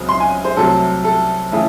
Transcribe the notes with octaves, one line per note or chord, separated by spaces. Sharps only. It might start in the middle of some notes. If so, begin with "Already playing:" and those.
Already playing: C#2 C#3 F#3 C4
C6
G#5
C5
C2 C3 F#3 A3 C4 A4
A4
C#3 E3 A3